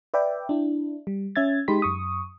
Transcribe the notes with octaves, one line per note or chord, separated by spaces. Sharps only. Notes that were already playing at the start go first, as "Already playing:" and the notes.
B4 D5 E5 G5
D4 E4
G3
C#4 E5 G#6 A6
G#3 D#4 G4 B5 C6 B6
F#2 C#6 D#6